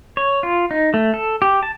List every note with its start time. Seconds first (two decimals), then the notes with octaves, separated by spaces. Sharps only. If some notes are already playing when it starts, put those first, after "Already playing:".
0.17 C#5
0.43 F4
0.71 D#4
0.94 A3
1.14 A4
1.42 G4
1.63 A5